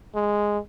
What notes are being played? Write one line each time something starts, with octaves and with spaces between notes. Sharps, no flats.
G#3